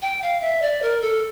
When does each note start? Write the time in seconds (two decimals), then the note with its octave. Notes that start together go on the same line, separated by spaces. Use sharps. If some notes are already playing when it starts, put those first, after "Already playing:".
0.02 G5
0.22 F5
0.41 E5
0.62 D5
0.82 A#4
1.02 A4